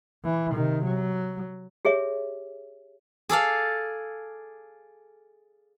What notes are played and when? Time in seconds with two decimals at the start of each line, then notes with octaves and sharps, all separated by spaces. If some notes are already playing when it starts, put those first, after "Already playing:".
0.24 E3
0.54 C3 D#3
0.84 F#3
1.85 G4 G#4 C#5 E5
3.29 G#4 A4 D5 F5